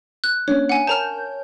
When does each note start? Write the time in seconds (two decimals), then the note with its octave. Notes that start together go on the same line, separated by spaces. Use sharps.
0.24 F#6
0.48 A#3 C#4 D4 C#5
0.69 F#5 G#5
0.87 A#4 C#5 A5 A#5 F6 G6